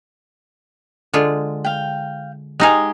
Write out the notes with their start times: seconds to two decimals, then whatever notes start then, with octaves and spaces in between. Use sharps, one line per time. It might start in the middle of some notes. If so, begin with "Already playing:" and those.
1.14 D3 G#3 F4
1.65 F5 G5
2.60 G#3 D#4 G4 D#5 F5 G#5